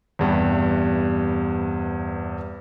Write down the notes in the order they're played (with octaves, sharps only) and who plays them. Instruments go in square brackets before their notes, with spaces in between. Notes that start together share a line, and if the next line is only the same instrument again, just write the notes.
[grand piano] E2 G2 C3